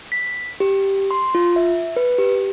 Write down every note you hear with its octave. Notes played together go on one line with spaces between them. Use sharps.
B6
G4
C6
F4
E5
B4
G4